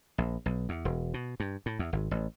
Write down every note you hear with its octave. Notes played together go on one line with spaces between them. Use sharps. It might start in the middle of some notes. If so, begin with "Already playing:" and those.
A#1
B1
E2
E1
B2
G2
A2
E2
G#1
A1